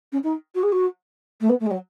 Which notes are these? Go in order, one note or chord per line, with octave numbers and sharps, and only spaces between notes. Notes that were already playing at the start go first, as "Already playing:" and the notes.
C#4
D#4
F#4
G#4
F#4
A3
B3
A3
G#3
F#3